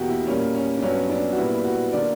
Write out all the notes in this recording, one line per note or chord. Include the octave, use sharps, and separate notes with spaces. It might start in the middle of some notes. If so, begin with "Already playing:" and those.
Already playing: E2 B2 A#3 F#4 G4
E4
A#2 G3 A#3 C#4
C#4
D4
G2 F#3 B3 C#4
D4
F#4
A#2 G3 B3 E4
F#4
D3 A#3 D5